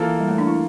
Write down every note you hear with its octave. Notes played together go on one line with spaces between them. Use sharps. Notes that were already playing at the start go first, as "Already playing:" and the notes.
Already playing: E3 A#3 F4 A4
G3
A3
D4
E4